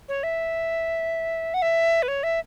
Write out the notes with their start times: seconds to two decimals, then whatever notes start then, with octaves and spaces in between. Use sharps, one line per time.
0.09 C#5
0.23 E5
1.54 F#5
1.62 E5
2.03 B4
2.08 C#5
2.23 E5